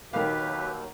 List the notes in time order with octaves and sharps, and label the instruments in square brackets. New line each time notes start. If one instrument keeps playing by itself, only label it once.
[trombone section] D#2 F#3 [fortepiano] D#3 F5 [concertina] G4 B4